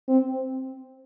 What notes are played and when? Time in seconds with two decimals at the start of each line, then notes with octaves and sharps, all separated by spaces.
0.08 C4